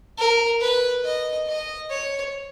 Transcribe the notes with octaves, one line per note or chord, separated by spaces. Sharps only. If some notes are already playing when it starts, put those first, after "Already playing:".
A#4
B4
D#5
D#5
C#5